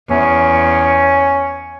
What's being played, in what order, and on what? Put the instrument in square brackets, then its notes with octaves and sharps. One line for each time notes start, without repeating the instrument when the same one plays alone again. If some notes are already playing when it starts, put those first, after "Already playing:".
[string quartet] E2 [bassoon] C#4